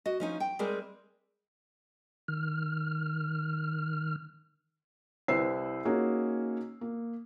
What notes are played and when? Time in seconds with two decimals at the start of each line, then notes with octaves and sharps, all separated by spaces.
0.06 F#4 D#5
0.20 F3 C#4 D#4
0.40 G5
0.59 G3 G#3 C4 G#4 A#4
2.28 D#3 F6
5.28 C2 E4 B4 C5 E6 C7
5.85 A#3 C#4 D#4 F#4 G#4
6.81 A#3